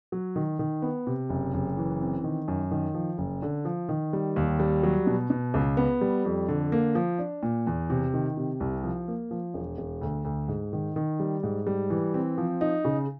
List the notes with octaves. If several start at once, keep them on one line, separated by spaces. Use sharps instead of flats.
F#3
D#3
D#3
B3
C3
F#1
F#1
E3
C4
D#3
F#2
D#3
F3
F#1
D3
F3
D#3
G3
D#2
G3
F#3
B2
B2
C#2
B3
G3
F2
D3
A#3
F3
D4
A#2
E2
C3
D#3
C3
C2
F3
A#3
F3
E1
E1
D2
D2
G#2
D#3
D#3
G3
G#2
G3
E3
C4
F3
D#4
C#3